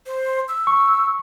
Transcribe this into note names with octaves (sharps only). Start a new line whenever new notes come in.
C5
E6
C#6